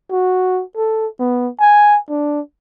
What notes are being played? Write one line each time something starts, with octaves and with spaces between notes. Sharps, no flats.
F#4
A4
B3
G#5
D4